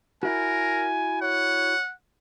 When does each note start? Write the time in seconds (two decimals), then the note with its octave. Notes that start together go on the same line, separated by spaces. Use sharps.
0.23 E4 F#4 A#4 G#5
1.21 C#5 F#5